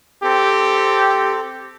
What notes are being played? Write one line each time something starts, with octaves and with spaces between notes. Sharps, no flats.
C4 G4 A4